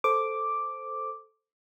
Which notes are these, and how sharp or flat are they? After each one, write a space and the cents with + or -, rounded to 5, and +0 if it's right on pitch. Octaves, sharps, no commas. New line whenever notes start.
A4 +0 C5 +0 D6 +0